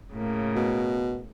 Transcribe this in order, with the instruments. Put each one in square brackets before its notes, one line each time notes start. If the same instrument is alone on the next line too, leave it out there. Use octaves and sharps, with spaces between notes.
[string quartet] A2 C#3 A#3
[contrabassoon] B2